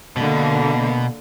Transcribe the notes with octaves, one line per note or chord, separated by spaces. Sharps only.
B2 D3 A#3